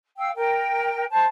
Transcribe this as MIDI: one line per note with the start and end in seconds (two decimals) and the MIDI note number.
0.18 0.29 77
0.18 0.29 79
0.18 0.29 88
0.35 1.05 70
0.35 1.05 79
1.10 1.24 72
1.10 1.24 81